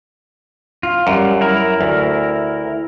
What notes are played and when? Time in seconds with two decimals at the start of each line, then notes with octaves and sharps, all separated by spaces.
0.83 F4
1.07 F#2 G3
1.41 E4 A#4
1.81 D2